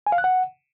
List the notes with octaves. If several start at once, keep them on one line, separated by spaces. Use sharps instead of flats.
G#5
F5
F#6
F#5